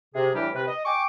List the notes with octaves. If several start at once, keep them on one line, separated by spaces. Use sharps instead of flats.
C3 G#4
A2 E3 G3 D4 G4 F6
C3 B4
D#5
G5 G#5 C#6 D6